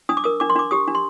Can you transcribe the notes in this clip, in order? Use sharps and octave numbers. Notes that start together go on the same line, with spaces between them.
D4 D#6
D6
A#4 D#6
D4 D6
C6
D4 D6
G4 D#6
D4
C6